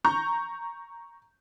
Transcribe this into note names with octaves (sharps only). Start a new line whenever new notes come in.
A#5 C#6 G6